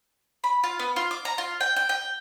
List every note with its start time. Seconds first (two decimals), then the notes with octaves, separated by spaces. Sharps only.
0.44 B5
0.64 F4
0.79 B3
0.96 F4
1.11 D6
1.25 A#5
1.38 F4
1.61 G5
1.76 G5
1.89 G5